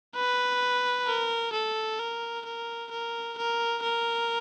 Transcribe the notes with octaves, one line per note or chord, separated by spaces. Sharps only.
B4
A#4
A4
A#4
A#4
A#4
A#4
A#4